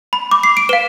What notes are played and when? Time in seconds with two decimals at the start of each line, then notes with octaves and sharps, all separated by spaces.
0.13 B5
0.31 D6
0.44 C7
0.57 D7
0.69 B4 F5 E7